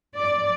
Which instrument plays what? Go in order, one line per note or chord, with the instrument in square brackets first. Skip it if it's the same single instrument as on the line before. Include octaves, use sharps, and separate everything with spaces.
[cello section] D5